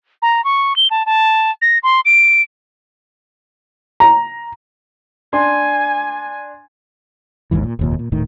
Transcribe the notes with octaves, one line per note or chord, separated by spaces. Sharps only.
A#5
C#6
G7
A5
A5
A#6
C6
D7
A#5
D4 G#5 C6
G#1 D#2 G#2 E3
A#2
F1 D#2 A#2
A#2
D#1 A2 D#3